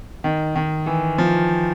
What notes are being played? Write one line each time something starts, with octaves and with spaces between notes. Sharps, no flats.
D#3
D#3
E3
F3